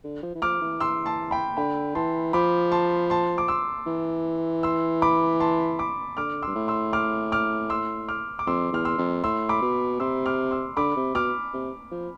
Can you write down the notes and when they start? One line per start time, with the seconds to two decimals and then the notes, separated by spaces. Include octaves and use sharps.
0.04 D3
0.23 F3
0.35 E3
0.42 F3 D6 F6
0.61 E3
0.80 C6 E6
1.06 A5 C6
1.31 G5 B5
1.57 D3 G5 B5
1.95 E3 A5 C6
2.33 F3 B5 D6
2.72 A5 C6
3.10 A5 C6
3.38 D6
3.48 C6 E6
3.87 E3
4.63 C6 E6
5.02 B5 D6
5.40 A5 C6
5.79 B5 D6
6.17 D3 D6 F6
6.42 G2 C6 E6
6.55 A2
6.68 C6 E6
6.93 D6 F6
7.32 D6 F6
7.70 C6 E6
8.08 D6 F6
8.39 D6
8.47 F2 C6 E6
8.72 E2 F6
8.85 C6 E6
8.98 F2
9.24 A2 C6 E6
9.49 B5 D6
9.62 B2
10.00 C3 C6 E6
10.26 D6 F6
10.51 C6 E6
10.77 D3 B5 D6
10.97 C3
11.15 B2 D6 F6
11.53 C3
11.91 F3